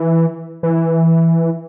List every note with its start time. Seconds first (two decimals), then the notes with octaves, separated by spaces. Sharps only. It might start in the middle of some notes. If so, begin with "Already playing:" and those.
Already playing: E3
0.63 E3